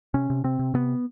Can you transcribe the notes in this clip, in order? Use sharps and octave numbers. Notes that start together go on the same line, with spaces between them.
C3 C#4
C3
C3 C4
C3
C3 B3